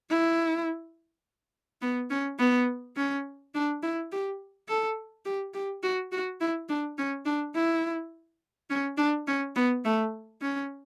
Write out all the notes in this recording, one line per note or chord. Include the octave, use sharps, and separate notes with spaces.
E4
B3
C#4
B3
C#4
D4
E4
G4
A4
G4
G4
F#4
F#4
E4
D4
C#4
D4
E4
C#4
D4
C#4
B3
A3
C#4